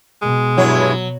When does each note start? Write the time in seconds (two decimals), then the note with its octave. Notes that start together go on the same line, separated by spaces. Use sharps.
0.22 B2 G#3
0.58 G2 F#3 E4 C#5